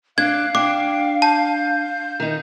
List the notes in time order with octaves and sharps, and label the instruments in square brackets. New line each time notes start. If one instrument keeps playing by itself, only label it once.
[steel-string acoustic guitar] D4 D5 [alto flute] F5 [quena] F#6 [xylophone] G#6
[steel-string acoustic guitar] D4 [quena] G5 [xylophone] D6
[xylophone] A5 [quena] G6
[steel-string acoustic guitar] D#3 D#4